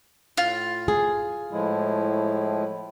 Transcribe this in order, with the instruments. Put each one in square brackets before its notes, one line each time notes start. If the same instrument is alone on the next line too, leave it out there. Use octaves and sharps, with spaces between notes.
[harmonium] A2 [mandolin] F4
[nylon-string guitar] G#4
[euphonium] A2 [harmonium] F3 G#3 E4